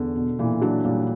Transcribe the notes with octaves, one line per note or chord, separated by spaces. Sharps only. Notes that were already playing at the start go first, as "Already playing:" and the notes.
Already playing: E2 D3
B2
A#2 E3
F#3 D4
A#2 G3